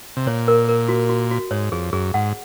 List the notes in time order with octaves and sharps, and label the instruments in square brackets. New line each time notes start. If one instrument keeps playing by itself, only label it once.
[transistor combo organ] C3
[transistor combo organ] A#2 [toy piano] C#5
[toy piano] A#4
A#4
F#4
F#4
F#4
[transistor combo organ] G#2 [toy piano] C#5
[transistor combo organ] F2 [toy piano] G#4
[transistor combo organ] F#2 [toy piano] G#4
[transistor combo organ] G#2 [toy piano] F#5